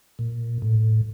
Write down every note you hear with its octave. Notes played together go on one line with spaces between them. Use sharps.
A#2
A2